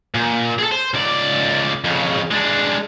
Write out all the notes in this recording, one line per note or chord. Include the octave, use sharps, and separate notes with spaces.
A#2
G#4 A4
C5
C#2 D5
F2 C#3
G#3 D4